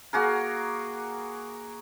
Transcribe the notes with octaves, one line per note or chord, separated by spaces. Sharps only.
A#3 F#4 G#4 A#4